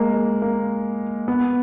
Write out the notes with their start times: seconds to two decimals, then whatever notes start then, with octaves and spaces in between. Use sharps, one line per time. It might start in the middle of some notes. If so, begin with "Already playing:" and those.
Already playing: G#3 A#3
0.14 A#3
0.42 A#3
1.28 B3